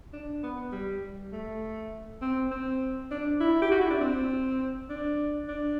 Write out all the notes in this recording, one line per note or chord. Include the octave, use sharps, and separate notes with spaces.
D4
B3
G3
A3
C4
C4
D4
E4
G4
F#4
E4
D4
C4
D4
D4